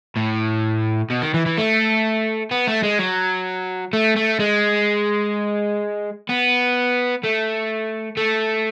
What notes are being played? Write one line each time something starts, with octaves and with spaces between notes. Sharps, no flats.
A2
B2
D#3
E3
E3
A3
B3
A3
G#3
F#3
A3
A3
G#3
B3
A3
A3